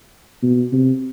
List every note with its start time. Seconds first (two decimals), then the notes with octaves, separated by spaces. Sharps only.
0.43 B2
0.72 C3